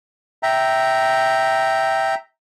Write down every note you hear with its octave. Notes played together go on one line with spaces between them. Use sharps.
E5 G5 A#5